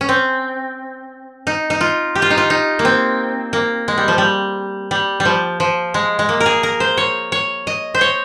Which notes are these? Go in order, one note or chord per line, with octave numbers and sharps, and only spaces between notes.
C#4
C4
D#4
D#4
F4
G4
F4
D#4
F4
D#4
A#3
C4
A#3
G#3
G3
F3
G3
G3
G3
F3
F3
G#3
G#3
A#3
A#4
G#4
A#4
C5
C#5
C#5
D#5
C5
C#5